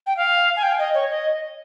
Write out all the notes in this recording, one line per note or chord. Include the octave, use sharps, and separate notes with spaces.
G5
F5
G#5
G5
D#5
C#5
D#5